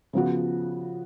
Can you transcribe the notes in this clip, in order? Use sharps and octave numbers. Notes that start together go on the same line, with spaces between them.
C#3 F3 B3 F#4